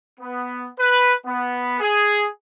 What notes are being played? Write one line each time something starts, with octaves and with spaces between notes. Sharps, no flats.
B3
B4
B3
G#4